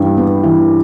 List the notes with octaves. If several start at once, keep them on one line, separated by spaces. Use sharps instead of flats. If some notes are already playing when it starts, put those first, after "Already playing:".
Already playing: G2 E3 G3
B3
E3